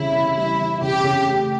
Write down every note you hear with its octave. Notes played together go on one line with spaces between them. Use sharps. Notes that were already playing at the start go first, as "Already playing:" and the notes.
Already playing: C#3 E3 G3 E4
C#3
G3 E4
E3
C#3 G4
C#3
A3